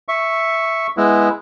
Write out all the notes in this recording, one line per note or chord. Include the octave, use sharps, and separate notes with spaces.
E5 C#6
G#3 B3 E4